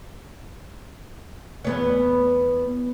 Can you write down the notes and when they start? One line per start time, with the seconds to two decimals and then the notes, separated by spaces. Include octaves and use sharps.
1.64 E2 B3 C#5